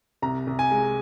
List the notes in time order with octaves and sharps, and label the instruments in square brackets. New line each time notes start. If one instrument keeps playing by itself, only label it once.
[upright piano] C2 A#5
C2
G#5
G#3